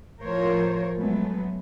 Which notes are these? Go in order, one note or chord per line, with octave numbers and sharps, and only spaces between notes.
A2 F3 F4 A#4 C5 C#5
F#3 G#3 A3 B3